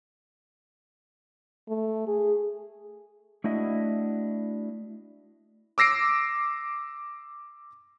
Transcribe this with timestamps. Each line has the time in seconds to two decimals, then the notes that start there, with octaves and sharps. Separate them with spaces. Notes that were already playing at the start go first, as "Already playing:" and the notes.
1.69 A3
2.08 G#4
3.44 A3 D4 E4 F#4 D#5 E5
5.78 D6 E6 A#6 C7 D7